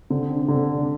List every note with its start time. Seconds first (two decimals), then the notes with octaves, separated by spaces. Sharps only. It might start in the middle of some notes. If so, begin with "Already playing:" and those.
0.10 D3 C4
0.30 C4
0.37 D4
0.48 D3
0.55 C4
0.62 D4
0.78 D4